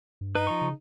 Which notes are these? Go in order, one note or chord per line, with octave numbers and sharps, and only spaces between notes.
G2
D#4 B4
F3 A#5 C#6
C#3